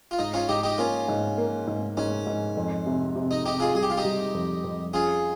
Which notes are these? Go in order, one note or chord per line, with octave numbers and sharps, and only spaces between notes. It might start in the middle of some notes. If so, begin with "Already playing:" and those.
F4
G#2 D#4
C#4 F4
G#2 D#4 G4
D#4 G4
A#3 C#4 F4
G#2
A#3
G#2
G#2 C#4
G#2
F2
C3
C3
D#4
C3 D#4 G4
F4 G#4
G3 G#4
G4
F4
D#4 G4
G3
F2
F2
C#4 F4 G#4